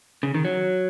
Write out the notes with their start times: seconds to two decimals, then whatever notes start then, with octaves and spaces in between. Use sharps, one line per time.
0.23 C#3
0.34 D#3
0.45 F#3